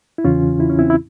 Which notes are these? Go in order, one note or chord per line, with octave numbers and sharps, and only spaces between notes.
E4
E2 C#3 E3 C#4 F4
E4
C#4
C4 E4
E4